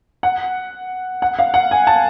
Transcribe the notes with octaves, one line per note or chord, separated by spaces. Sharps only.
F#5
F#5
F5
F#5
G#5
A5